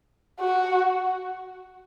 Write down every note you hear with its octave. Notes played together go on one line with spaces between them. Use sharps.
F#4